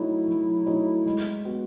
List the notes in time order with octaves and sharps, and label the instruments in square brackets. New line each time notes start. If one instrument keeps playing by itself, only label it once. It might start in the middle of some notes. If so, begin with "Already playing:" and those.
Already playing: [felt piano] F#3 A3 D#4 F#4 C#5 [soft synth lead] E4
[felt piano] F#3
A3 D#4 F#4 C#5
G#3
B3 F#4